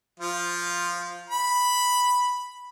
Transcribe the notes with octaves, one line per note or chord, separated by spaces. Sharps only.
F3 F4
B5